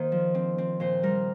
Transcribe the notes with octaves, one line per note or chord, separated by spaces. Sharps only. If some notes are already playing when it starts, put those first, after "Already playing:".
Already playing: D#3 A#3 C5
F3
C4
C4
A#2 C5
G3 A#4